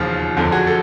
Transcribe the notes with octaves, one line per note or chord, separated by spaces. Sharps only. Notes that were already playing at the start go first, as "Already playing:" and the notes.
Already playing: E1 D#2 C#3 F3 F4
F#1 F2 D3
F#4 G#4
A4